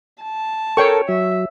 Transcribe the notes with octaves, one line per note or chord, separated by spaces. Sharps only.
A5
A4 A#4 C#5 G5 C#6
F#3 E5